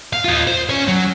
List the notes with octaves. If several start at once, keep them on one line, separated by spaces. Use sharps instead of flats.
F5
F4 D#5
C5
C#4 C#5
F#3